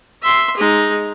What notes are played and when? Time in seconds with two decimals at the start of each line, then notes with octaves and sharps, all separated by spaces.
0.22 E5 C6
0.57 G#3 D#4